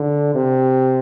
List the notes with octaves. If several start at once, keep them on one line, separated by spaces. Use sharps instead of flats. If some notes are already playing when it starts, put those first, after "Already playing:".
Already playing: D3
C3